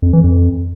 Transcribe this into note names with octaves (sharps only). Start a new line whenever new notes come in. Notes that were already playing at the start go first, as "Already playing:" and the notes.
F2
E3
F2